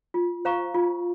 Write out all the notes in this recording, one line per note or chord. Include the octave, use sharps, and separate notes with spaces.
F4
C5 F5 A#5 C#6
F4